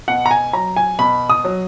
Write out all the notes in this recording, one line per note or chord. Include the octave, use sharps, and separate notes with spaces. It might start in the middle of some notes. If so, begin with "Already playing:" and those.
B2 F#5
A#5
G#5
F#3 A#5
G#5
B2 B5
D#6
F#3